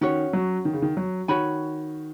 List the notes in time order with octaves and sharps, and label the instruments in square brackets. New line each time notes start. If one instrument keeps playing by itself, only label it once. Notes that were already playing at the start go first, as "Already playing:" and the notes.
[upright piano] D#3 [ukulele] C#4 F#4 C#5
[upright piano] F#3
D#3
C#3
D#3
F#3
[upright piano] D#3 [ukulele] F#4 C#5 G#5 B5